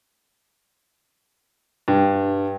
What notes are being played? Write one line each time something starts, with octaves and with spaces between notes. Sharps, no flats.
G2